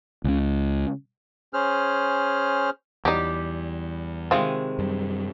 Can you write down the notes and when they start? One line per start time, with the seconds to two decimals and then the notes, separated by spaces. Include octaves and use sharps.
0.24 C#2 C#3
1.54 C#4 G#4 C5 F6
3.05 E2 F#3 G3 D#4 G4
4.31 C3 D#3 G#3 C4 F4
4.78 F#2 G3